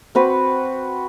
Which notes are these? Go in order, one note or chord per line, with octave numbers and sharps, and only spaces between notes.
C4 F#4 B4